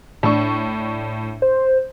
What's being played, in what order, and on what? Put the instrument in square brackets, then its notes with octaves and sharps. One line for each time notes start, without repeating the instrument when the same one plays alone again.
[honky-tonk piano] A2 D4 C#6
[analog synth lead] C5